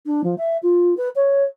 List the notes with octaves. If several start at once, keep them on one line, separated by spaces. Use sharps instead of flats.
D4
F3
E5
F4
B4
C#5